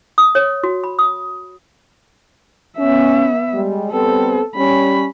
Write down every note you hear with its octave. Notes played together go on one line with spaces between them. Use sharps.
D#6
C#5
F#4
B5
D#6
B3 C#4 E5
G3 G#3
G3 B3 C4 A4
G3 C#4 B5